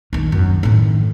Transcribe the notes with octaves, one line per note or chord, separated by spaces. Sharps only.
A#1 D#3
F#2
A2 D#3